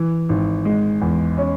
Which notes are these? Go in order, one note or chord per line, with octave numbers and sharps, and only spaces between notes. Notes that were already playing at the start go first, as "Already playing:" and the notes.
Already playing: E3
G#1
G#3
E2
C#4